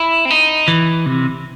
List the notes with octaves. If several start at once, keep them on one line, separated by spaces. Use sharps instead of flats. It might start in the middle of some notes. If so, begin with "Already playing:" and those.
Already playing: E4
C4
D#4
E3
C3